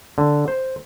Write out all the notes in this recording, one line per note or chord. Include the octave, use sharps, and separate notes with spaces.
D3
C5